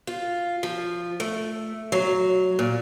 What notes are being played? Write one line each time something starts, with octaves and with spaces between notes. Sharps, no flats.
F4
F3
A3
F#3
A#2